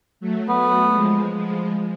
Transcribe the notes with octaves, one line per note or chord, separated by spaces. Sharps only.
F#3 A3
F#3 A3 B3
F3 G#3
F3 G#3